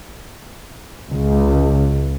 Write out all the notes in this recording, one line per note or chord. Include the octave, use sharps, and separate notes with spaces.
C#2